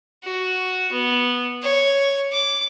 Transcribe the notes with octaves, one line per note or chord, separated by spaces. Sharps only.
F#4
B3
C#5
D6